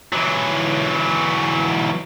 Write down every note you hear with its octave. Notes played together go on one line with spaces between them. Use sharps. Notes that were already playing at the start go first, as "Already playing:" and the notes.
E3 F#3